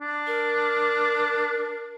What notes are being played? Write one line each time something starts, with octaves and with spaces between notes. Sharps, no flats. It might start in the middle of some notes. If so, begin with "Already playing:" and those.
D4
A#4